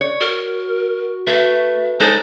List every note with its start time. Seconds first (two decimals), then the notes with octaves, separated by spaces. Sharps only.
0.01 C#5 D5
0.21 F#4 A#4
1.27 A3 B4 E5
2.00 G#3 D#4 A4 C5 C#5 A#5